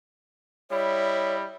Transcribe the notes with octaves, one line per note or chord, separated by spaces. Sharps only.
G3 E4 C#5 D#5